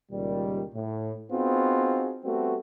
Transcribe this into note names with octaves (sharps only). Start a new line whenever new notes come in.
C#2 A#2 D#3 G3
A2
B3 C4 D#4 F4 F#4 G#4
G3 A3 B3 C4 F#4